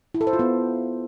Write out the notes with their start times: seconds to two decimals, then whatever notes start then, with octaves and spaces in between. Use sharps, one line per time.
0.14 E4
0.21 A4
0.27 C5
0.33 F4
0.39 B3